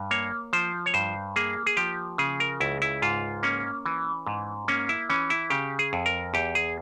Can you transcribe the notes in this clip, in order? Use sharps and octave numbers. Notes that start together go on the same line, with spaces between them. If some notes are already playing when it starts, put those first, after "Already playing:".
Already playing: G2
A#3 C#5
F3 C5
C#5
G2 C5
A#3 G#4
G#4
F3 G4
C#3 G#4
A#4
C#2 E4
E4
G#2 F4
A#3 C#4
E3
G#2
A#3 C#4
E4
E3 C#4
E4
C#3 G4
G#4
F2
A#4
E2 G4
G#4